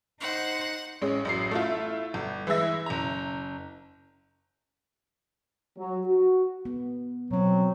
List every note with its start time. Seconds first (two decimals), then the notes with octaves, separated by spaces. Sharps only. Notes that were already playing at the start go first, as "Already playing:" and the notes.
0.21 D#4 C5 F#5
1.02 A1 G#3 C#4
1.25 A1 F#2 C7
1.51 A3 E4 F4
2.14 G1
2.47 E3 G#3 E4 E5 A#6
2.86 F#1 A#5
5.78 F#3
6.06 F#4
6.65 B3
7.31 B2 F#3 C4